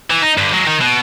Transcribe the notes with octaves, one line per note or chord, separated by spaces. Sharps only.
E3
D#4
G2 D3
F#3 G#3
D#3
B2